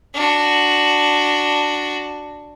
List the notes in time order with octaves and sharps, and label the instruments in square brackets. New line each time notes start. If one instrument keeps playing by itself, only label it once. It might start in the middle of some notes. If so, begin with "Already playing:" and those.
[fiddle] D4 F#4